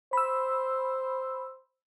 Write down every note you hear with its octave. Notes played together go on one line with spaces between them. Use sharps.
C5 B5 E6